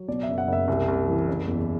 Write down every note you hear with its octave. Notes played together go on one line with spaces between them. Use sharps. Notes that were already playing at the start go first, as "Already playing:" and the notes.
Already playing: F#3
B2 D5
F#1 E5
F#5
F#1
E5
C2
C2
E3
F#1
E2